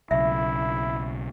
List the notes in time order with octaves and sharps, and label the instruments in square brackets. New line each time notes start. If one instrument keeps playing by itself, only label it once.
[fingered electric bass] B1 C#3 [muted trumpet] E4 [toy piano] E5